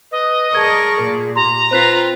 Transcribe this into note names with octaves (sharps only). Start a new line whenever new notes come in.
B4 D#5
G#4 A#4 D5 A5 C#6 G#6
A#2
G4 A#5 C6
C4 F4 B4 C5 F#6 B6